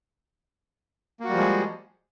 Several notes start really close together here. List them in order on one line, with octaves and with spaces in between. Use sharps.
A#3 F#4 G3 F3 G#3